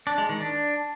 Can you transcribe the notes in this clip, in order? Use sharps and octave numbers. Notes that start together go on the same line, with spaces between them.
D4
G#3
D#3
D4